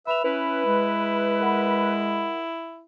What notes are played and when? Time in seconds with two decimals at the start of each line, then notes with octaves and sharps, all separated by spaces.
0.07 B4 E5 B5 F7
0.24 C#4 E4 B4
0.65 G#3
1.40 A#4 F#5 B5